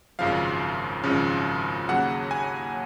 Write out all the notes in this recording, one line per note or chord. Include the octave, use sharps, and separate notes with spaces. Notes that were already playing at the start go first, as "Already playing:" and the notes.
G#1 F#2 C#3 F3 F5
G#1 F#2 C#3 F3
D#2 C#3 F#3 F#5
G#5